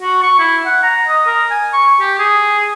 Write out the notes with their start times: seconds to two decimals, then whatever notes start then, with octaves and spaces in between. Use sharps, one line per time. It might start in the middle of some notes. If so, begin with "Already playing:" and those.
0.02 F#4
0.23 C#6
0.39 E4
0.66 F#5
0.83 A#5
1.08 D#5
1.26 A#4
1.50 G#5
1.73 C#6
2.00 G4
2.19 G#4